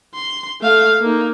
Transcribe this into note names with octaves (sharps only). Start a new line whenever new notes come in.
C6
A3 F5
A#3 D#4